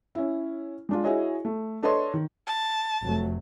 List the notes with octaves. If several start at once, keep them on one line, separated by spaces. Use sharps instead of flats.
C#4 E4
G#3 D4 F4
E4 F#4 G#4 C#5 D#5
A3
D4 A4 B4 C#5 D#5 C6
D#3
A5
F1 F#3 A3